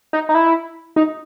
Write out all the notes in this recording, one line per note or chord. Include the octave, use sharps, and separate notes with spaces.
D#4
D#4
E4
D#4